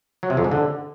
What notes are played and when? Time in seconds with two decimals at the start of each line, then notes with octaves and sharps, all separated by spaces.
0.23 F#3
0.30 C3
0.37 F2
0.44 G#2
0.52 D3